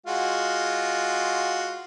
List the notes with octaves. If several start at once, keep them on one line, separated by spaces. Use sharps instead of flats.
G#3 F4 F#4